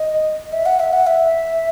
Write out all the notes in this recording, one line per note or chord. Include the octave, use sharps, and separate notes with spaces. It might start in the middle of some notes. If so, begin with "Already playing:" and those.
Already playing: D#5
E5
F#5
E5
F#5
E5